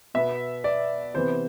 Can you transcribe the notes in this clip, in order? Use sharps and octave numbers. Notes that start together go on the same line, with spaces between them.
B2 B3 E5
D5
C3 E3 B3 C5